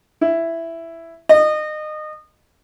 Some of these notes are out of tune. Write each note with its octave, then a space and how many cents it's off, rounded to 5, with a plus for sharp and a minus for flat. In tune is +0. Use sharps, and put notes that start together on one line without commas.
E4 +10
D#5 -25